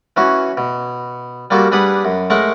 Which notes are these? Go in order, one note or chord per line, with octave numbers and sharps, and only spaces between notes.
E3 C#4 F#4
B2
G3 A#3 F4 F#4 A4
G3 D4 G#4 B4 F#5
F#2
G#3 A3 A#4 C#5 F#5 C#6